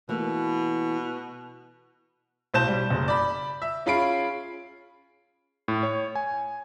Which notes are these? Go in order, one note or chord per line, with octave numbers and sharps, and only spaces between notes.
B2 E3 A3 A#3
B1 A2 C5 A5 G6 E7
G3
F#1
D5 B5
E5
C#4 F4 G#4 B5 C7 D7
A2
C#5
G#5